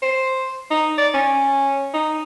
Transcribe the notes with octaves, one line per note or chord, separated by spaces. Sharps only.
C5
D#4
D5
C#4
D#4